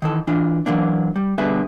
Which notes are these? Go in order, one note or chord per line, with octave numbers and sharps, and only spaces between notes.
D#3 E3 A4
E3 D4 F4
E3 F#3 A#3 D4
G3
B2 D3 G3 G#4 B4 E5